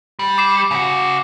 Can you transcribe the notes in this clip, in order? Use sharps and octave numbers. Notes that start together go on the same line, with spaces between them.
G3
D6 C7 E7
C#3 F#4